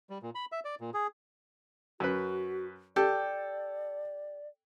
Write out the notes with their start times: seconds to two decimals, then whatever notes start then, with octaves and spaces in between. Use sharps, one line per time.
0.10 G3
0.23 A#2
0.35 B5
0.52 E5
0.65 D5
0.81 A#2
0.94 G#4
2.00 F#2 F#4 B4
2.96 G4 A4 D5